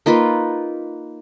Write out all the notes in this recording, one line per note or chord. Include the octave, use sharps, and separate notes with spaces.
A#3 D#4 F4 B4